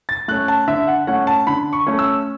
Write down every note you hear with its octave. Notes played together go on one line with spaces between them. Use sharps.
A6
A3 C#4 F#6
A5
D3 E5
F#5
A3 C#4 F#5
A5
D3 B5
C#6
A3 C#4
E6